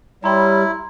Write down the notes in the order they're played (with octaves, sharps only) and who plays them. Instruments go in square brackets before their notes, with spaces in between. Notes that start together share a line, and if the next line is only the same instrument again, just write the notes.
[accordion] G3 [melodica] E4 [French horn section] C#5 [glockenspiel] A#5 C6